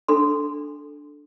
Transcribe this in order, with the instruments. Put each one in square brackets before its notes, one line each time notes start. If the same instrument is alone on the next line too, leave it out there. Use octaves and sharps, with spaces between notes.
[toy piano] D4 A4 C6